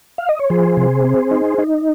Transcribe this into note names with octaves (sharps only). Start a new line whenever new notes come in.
F5
D#5
C#5
F3 G#4 C5
C3
C4
D#4
D#4